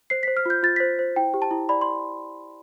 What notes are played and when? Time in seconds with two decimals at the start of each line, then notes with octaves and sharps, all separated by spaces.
0.10 C5 C7
0.23 B6
0.28 C5
0.37 F6
0.46 F4 G6
0.63 F4 A6
0.76 C5 B6
0.99 C5
1.16 E4 G5
1.34 G4
1.42 A5
1.51 E4
1.69 D5 B5
1.81 C6